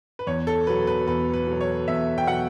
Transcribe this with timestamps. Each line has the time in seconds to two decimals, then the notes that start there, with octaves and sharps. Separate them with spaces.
0.19 B4
0.27 E2 C#5
0.47 A4
0.67 B2 F#3 B4
0.87 B4
1.07 E2 B4
1.33 B4
1.47 B2 F#3
1.61 C#5
1.88 E2 E5
2.18 G5
2.27 B2 F#3 F#5